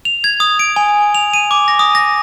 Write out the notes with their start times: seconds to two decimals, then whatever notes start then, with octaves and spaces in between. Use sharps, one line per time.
0.05 F7
0.24 G#6
0.40 D#6
0.59 D7
0.76 G#5
1.15 F7
1.34 D#7
1.51 D6
1.68 A#6
1.79 D#6
1.95 A#6